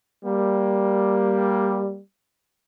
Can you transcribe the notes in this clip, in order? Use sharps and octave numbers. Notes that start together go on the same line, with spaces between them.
G3 A#3